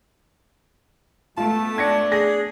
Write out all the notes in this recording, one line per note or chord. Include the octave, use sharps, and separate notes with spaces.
A3 B3 F4 A5
D4 G#6 A#6 C#7
G#4 A#6